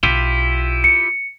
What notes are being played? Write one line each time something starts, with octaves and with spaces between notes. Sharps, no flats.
B1 E4 F4 G4
C#7